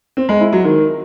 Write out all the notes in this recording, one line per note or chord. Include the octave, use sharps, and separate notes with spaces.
C4
G#3
E4
F#3
D#3